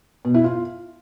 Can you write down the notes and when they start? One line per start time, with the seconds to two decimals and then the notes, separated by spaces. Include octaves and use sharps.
0.25 B2
0.34 E4
0.44 F4